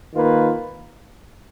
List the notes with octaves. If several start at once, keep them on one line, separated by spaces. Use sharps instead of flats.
D#3 A#3 F4 B4